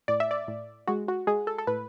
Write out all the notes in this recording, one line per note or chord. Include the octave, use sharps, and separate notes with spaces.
A2 D5
E5
D5
A2
G#3 F#4
F#4
G#3 G#4
A4
A4
A2 B4